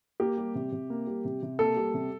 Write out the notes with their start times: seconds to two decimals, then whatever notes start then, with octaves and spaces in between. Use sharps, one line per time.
0.20 A#3 G4
0.37 G3
0.55 C3
0.72 C3
0.90 A#3
1.07 G3
1.25 C3
1.43 C3
1.59 A#3 A4
1.76 G3
1.94 C3